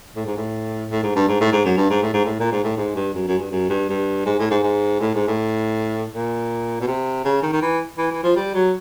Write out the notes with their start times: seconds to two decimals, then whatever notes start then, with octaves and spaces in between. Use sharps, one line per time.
0.16 A2
0.26 G#2
0.37 A2
0.91 A2
1.03 G#2
1.16 G2
1.28 G#2
1.41 A2
1.53 G#2
1.65 F#2
1.77 G2
1.90 G#2
2.03 A2
2.14 G#2
2.25 A2
2.40 A#2
2.52 G#2
2.64 A2
2.77 G#2
2.96 G2
3.15 F#2
3.27 F#2
3.39 G2
3.52 F#2
3.70 G2
3.89 G2
4.26 G#2
4.39 A2
4.51 G#2
4.63 G#2
5.01 A2
5.14 G#2
5.28 A2
6.12 A#2
6.81 B2
6.88 C3
7.25 C#3
7.42 D#3
7.53 D#3
7.62 E3
7.98 E3
8.11 E3
8.24 F3
8.36 G3
8.55 F#3